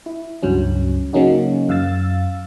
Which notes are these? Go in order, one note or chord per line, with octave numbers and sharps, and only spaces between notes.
E4
C#2 G2 F#3 C#4
C#3 F#3 A#3 C#4 D#4 F#4
F#2 F5 E6 A6